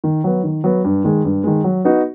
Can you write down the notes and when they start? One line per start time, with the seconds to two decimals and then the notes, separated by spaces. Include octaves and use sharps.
0.04 D#3
0.24 F#3 B3
0.44 D#3
0.64 F#3 B3
0.84 G2
1.04 D#3 G#3
1.25 G2
1.44 D#3 G#3
1.64 F#3
1.85 B3 D#4 F#4